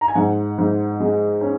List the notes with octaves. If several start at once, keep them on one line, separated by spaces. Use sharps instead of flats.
A#5
G#5
G#2 F#5
G#2
G#3
C#4